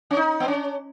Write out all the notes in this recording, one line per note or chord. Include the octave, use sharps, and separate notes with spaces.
C#4
D#4
B3
C#4